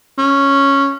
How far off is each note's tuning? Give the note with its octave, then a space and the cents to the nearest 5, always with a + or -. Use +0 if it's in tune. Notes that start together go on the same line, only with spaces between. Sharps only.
C#4 -5